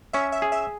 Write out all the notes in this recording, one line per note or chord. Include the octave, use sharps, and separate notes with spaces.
C#4 E5
E5
G#4
E5